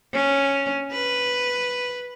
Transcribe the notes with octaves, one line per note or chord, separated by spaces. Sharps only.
C#4
B4